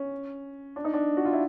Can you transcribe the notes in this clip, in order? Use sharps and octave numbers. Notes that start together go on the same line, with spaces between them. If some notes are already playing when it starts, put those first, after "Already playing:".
Already playing: C#4
D4
D#4
D4
F#4
F4
E4